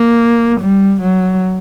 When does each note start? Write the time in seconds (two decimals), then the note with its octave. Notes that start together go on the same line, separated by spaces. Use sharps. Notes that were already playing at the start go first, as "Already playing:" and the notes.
Already playing: A#3
0.60 G3
1.01 F#3